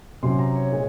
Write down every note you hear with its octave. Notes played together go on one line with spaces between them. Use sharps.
C3 F#3 C#4 C6
A#5
C#5
A#2 G#3